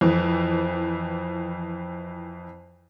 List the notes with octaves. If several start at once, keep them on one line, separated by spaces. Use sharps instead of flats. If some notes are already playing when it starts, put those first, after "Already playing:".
F2 E3